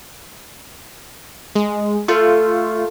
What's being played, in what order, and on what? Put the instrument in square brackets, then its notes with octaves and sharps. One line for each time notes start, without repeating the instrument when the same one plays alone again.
[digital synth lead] G#3
[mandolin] A3 [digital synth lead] F4